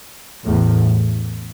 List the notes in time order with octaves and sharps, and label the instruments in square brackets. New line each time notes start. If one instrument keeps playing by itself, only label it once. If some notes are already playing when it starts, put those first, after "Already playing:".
[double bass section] E2 A2